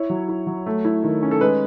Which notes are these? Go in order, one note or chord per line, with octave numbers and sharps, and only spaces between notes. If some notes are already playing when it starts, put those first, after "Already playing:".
Already playing: E4 C#5
F#3
E4
F#3
A3
E4
D#3
C#4
A4
G#3 B4